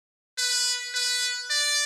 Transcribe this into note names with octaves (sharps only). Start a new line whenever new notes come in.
B4
B4
D5